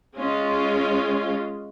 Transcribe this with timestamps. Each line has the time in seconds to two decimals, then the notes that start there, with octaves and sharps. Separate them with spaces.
0.15 G#3 C#4 F4